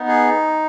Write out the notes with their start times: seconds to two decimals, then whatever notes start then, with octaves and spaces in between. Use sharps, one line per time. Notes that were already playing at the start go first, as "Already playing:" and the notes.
Already playing: B3 D#4
0.08 G#4